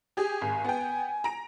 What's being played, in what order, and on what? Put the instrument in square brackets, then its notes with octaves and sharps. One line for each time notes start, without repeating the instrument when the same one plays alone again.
[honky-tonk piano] G4 G#4
[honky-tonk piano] G#1 [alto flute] G#5
[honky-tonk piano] B3 G5
A#5 D7